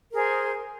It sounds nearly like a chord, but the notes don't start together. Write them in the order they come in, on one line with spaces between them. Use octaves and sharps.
A#4 G#4 C5